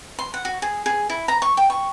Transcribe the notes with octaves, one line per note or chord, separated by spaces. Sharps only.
C6
F#5
F#4
G#4
G#4
E4
A#5
C#6
G5
C#6